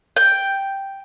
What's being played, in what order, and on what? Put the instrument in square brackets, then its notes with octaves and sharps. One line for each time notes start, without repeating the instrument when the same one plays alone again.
[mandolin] G5